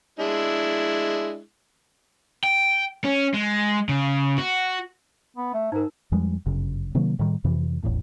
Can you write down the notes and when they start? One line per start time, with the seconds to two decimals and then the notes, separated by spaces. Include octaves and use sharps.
0.19 G#3 D4 E4
2.44 G5
3.04 C#4
3.34 G#3
3.89 C#3
4.38 F#4
5.36 B3
5.54 A3
5.72 G#2 D#4 A#4
6.12 F2 F3 G3 G#3
6.46 G1 F#2 C#3
6.95 C3 D#3 F#3 A#3
7.19 A2 D#3 G3
7.44 F2 C3 E3
7.83 D#1 A1 E2 A2